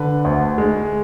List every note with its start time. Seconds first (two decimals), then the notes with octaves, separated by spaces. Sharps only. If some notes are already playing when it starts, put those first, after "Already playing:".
Already playing: D3 B4
0.25 D2
0.58 G#3